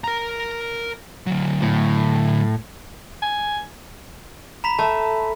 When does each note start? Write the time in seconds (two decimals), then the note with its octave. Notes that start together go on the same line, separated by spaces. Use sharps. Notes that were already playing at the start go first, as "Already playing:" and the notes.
0.04 A#4 A#5
1.27 D3 F#3
1.62 A2
3.22 G#5
4.64 A#5 B5 B6
4.79 A3 A5